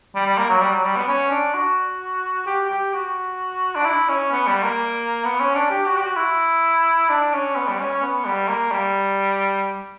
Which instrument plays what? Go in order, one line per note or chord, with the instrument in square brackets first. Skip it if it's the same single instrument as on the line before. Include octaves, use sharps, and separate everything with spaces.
[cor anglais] G3
G3
A#3
F#3
G3
F#3
G3
B3
C#4
D4
F#4
G4
G4
F#4
D4
E4
C#4
B3
G3
A#3
B3
C#4
D4
G4
F#4
G4
F#4
E4
D4
C#4
B3
G3
C#4
C#4
B3
G3
A#3
G3